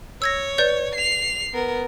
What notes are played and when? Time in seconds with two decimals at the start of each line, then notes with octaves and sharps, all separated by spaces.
0.22 C#5 E6 G#6 A#6
0.58 B4 D5 G6
0.95 C7 F7
1.53 B3 A#4